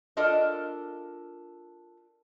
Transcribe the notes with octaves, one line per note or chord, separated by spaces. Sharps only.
D4 F4 A4 A#4 D#5